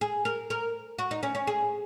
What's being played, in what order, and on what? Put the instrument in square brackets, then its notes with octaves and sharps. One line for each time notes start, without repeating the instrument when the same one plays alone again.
[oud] G#4
A#4
A#4
F#4
D#4
C#4
C#4
G#4